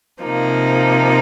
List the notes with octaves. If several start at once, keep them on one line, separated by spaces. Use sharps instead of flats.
C3 F3 A#3 D#4